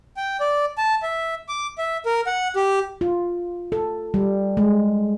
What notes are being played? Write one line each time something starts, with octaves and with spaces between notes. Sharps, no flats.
G5
D5
A5
E5
D6
E5
A#4
F#5
G4
F4
A4
G3
G#3